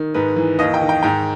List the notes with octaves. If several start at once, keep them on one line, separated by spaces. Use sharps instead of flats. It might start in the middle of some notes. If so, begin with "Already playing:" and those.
Already playing: D#3
G#2 B4
E3
D#2 D#5
G5
D#3
G5
G#2 G5